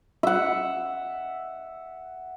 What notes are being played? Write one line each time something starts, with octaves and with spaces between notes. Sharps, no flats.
E5 F#5